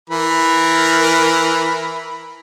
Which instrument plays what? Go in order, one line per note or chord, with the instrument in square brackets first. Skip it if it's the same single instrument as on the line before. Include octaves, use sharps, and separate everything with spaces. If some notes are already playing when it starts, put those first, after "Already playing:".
[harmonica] E3 A#4 B5